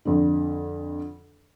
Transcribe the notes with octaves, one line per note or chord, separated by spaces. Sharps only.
F2 D3